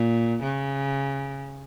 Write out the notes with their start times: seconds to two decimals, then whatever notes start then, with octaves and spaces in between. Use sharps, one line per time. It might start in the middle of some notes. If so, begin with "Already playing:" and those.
Already playing: A#2
0.43 C#3